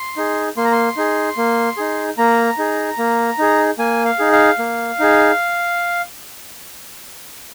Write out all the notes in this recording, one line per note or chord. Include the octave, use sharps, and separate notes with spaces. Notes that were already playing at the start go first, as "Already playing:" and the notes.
Already playing: C6
D#4 G#4
A#3 C6
A#5
C6
D#4 G#4
A#3
D#4 G#4
A#3 A#5
D#4 G#4
A#3
D#4 G#4
A#3 G#5
F5
D#4 G#4
F5
A#3
D#4 G#4